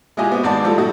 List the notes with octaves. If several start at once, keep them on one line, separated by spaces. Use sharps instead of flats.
G#3 E4 F4 G4 D#5 G#5
B3 C4 F#4
G#1 G#2 D5 A5 D6
A2 F3 G3 A4
G3 D#4 E4 F#4 A4